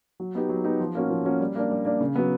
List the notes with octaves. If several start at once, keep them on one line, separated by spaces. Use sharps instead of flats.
F#3
B3 D#4 G4
F#3
B3 D#4 G4
F3
A#3 C#4 F#4
F3
A#3 C#4 F#4
G3
A#3 D4
G3
A#3 D4
C#3
F#3 B3